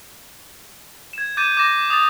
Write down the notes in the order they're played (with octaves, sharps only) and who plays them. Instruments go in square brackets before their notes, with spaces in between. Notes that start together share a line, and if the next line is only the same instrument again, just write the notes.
[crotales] G#6 E7
D6 G6 A6 D#7 E7
D6 A#6
D#6 A6